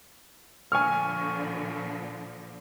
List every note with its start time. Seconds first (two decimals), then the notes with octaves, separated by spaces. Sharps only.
0.72 A#2 D3 F3 G#5 C#6 F6